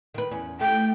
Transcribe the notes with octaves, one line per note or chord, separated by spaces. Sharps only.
D#3 B4
E2 C#4
A3 G5